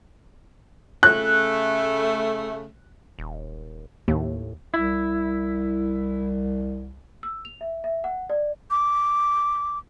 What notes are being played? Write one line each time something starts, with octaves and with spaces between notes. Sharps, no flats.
C#3 A3 F#6
D#1
D#2 A2
C2 E4
E6
F7
E5
E5
F#5
D5
D6